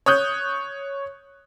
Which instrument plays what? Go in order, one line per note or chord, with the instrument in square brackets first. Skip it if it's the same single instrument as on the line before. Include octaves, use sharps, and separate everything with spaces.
[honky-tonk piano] C#5 D#6 F#6 G6